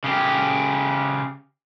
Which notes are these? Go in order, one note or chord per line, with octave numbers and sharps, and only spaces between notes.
C#3 G4